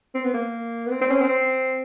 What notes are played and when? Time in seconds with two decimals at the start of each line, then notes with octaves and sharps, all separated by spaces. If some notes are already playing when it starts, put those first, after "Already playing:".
0.14 C4
0.24 B3
0.34 A#3
0.86 B3
0.91 C4
1.01 C4
1.11 C#4
1.21 C4